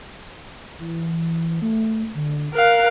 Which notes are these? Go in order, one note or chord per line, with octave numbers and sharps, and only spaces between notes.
E3
A3
D3
A#4 F5 F#6